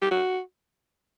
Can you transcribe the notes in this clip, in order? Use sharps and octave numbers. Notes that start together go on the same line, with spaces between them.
G4
F#4